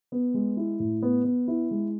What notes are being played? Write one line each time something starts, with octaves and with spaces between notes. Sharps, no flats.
B3
G#3
E4
A2
B3
B3
E4
G#3